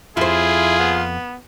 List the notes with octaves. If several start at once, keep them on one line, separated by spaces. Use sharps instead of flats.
F2 E4 F4 G#4 C5
B3